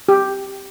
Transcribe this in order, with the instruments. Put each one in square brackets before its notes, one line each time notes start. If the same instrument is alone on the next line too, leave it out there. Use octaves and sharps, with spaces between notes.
[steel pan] G4